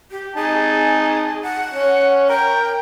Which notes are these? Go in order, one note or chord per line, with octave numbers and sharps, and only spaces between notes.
G4
D#4 G#4 A5
F#5
C#4
A#4 G5